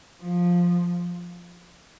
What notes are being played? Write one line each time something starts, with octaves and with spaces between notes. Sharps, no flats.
F3